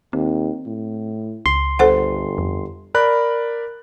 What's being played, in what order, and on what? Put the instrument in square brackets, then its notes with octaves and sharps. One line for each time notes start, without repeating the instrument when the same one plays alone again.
[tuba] D#2 [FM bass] C4
[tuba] A2
[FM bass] C#2 [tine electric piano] C6
[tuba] G1 [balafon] A4 C5 F#5
[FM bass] F2
[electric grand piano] A#4 D5 B5 F#6